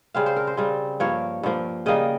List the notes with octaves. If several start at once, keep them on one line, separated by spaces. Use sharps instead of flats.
C#3 G3 C4 F5
C5
A#4
C5
C#3 G3 C4
G2 F3 A#3 C#5
G2 F3 A#3
C#3 G3 A#3 D#5